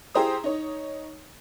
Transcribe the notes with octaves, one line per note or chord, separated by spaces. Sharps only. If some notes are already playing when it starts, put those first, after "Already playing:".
E4 G4 G#4 C5 A#5 D#6
D#4 C#5